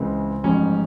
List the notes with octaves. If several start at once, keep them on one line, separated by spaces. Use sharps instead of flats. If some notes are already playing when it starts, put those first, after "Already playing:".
Already playing: C#2 C#3 E3 G#3 C4
A1 G#2 F3 G#3 C#4